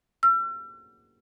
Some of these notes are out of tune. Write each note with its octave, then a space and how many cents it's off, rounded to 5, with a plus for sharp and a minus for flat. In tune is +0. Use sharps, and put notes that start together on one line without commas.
E6 +45